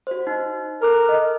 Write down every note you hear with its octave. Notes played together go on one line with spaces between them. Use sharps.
F#4 C5
D#4
A4 A#4 D6 F#6
D#5